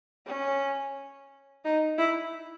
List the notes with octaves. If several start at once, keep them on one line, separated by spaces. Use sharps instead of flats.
C#4
D#4
E4